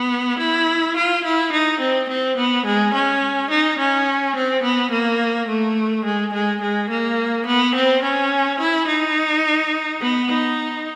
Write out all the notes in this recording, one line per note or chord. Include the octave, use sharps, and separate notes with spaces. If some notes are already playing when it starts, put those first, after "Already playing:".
Already playing: B3
E4
F4
E4
D#4
C4
C4
B3
G#3
C#4
D#4
C#4
C4
B3
A#3
A3
G#3
G#3
G#3
A#3
B3
C4
C#4
E4
D#4
B3
D#4